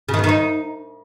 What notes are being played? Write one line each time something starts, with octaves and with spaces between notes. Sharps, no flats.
C#3
D#3
B3
D#3
D#4